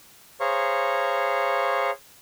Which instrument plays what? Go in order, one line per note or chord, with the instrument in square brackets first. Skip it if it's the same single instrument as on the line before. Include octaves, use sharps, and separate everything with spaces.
[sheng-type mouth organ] G#4 C5 C#5 F5 A#5 C#6